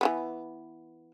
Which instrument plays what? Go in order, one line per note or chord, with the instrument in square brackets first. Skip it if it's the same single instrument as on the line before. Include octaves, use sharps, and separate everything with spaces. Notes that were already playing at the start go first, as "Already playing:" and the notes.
[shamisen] E3 G3 B3